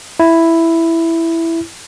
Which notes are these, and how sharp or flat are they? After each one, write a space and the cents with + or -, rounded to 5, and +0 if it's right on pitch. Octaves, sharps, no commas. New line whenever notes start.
E4 +5